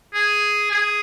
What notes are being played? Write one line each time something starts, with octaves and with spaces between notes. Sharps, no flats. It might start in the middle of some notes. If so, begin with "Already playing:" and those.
G#4
G#4